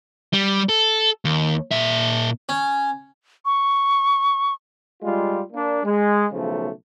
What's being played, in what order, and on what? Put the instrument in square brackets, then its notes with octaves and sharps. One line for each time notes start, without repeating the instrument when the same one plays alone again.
[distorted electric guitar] G3
A4
D#2
A#2 E5
[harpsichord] C#4
[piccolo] C#6
[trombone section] G3 G#3 F4
A#3 D4
G#3
B1 C#3 F3 A3